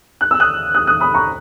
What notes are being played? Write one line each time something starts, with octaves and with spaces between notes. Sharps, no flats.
F#6
E6
D#6 F#6
D#6 F#6
D#6 F#6
B5 D#6
A#5 C#6